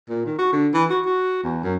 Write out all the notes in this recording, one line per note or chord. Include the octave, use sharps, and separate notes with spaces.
A#2
D#3
F#4
D3
E3
F#4
F#4
E2
F#2